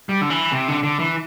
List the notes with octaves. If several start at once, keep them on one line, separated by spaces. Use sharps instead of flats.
G3
D3
E3
C3
D3
D3
E3